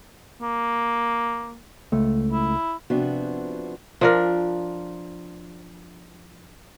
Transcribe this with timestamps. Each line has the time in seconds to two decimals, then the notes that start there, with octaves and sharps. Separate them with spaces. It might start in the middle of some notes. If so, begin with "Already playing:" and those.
0.42 A#3
1.92 C#2 A3
2.31 E4
2.90 C3 F3 B3 D4 F#4
4.01 F3 D4 A#4